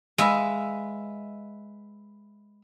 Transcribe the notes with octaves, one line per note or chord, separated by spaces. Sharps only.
G#3 B4 E5 F5